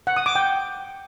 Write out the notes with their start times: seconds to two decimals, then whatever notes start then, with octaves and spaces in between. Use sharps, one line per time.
0.07 F#5
0.16 D#6
0.26 D6
0.35 G5